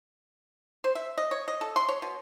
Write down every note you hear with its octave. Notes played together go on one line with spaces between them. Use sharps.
C5
E5
D#5
C#5
D#5
A4
C6
C#5
B2